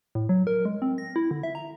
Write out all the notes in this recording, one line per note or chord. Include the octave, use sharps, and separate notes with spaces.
A2
F#3
A#4
G#3
C4
A#6
E4
D3
E5
A#5